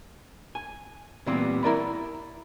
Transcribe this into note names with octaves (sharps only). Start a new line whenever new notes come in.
G#5
A#2 E3 G3 B3 C4
E4 A#4 D5 B5